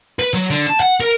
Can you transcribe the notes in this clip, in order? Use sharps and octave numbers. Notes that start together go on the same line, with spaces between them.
B4
F#3
D3
A5
F#5
A#4